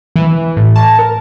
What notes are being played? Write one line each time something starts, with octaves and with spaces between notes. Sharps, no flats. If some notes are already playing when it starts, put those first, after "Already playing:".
E3
A2
A5
A#4